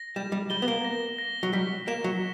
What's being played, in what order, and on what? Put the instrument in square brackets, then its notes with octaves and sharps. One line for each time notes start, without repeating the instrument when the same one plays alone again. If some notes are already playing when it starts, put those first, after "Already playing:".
Already playing: [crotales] A#6
[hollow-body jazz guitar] G3 [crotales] E7
[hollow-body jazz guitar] G3
[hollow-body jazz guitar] G3 [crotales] G7
[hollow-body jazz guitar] B3
A#3
[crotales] A#6
A#6
[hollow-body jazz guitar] F#3
[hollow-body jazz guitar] G3 [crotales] B6
[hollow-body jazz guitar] A#3 [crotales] E7
[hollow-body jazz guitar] F#3